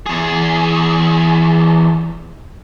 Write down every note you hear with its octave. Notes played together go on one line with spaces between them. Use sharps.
E2 G#4